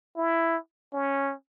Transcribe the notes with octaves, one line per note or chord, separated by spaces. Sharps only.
E4
C#4